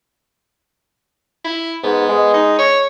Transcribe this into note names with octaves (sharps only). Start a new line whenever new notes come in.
E4
G#2 B3
G#3
D#4
C#5